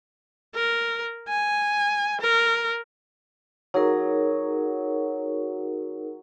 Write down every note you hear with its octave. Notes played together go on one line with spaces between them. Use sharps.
A#4
G#5
A#4
F#3 D#4 G#4 A#4